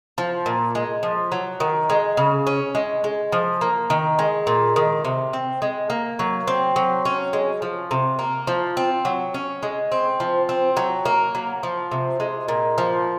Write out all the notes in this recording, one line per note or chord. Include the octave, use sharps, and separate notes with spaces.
F3
A#2
G#3
F3
F#3
D#3
G#3
C#3
C#4
G#3
G#3
F3
A#3
D#3
G#3
A#2
D#3
C3
C4
G#3
A#3
F#3
C4
F#3
C#4
G#3
F3
C3
A#3
F3
C4
F#3
C#4
G#3
C4
F3
C4
F#3
A#3
F#3
F3
C3
G#3
A#2
F3